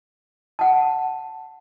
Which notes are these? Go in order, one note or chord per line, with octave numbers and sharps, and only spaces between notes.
F#5 A5